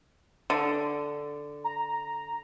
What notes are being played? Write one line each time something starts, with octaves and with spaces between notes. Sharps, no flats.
D3
A#5